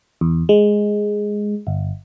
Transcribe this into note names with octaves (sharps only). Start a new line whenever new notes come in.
E2
G#3
G1